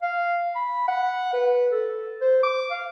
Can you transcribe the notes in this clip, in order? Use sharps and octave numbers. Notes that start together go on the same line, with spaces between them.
F5
B5
F#5
B4
A4
C5
D6
F5